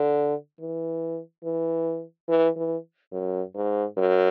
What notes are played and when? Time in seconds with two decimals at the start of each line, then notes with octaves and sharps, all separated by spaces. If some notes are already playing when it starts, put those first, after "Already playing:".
Already playing: D3
0.60 E3
1.44 E3
2.29 E3
2.56 E3
3.12 F#2
3.55 G#2
3.97 F#2